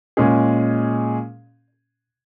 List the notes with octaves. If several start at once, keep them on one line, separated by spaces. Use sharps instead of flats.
A#2 G#3 C#4 G#4